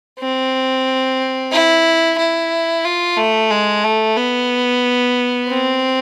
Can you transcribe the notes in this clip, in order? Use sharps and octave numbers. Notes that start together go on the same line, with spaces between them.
C4
E4
E4
F4
A3
G#3
A3
B3
C4